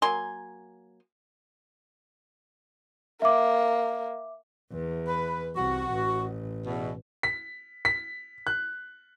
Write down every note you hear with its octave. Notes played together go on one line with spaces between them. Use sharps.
F#3 A#3 G#5 C6
A#3 E5 D6
E2
B4
C2 F#4
A1
E2 B2
B6
B6
F#6